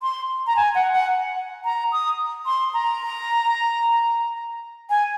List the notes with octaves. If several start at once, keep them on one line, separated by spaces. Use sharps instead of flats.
C6
A#5
G#5
F#5
F#5
A#5
D#6
C6
A#5
G#5